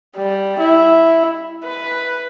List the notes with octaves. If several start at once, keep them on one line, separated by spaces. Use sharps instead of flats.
G3
E4
B4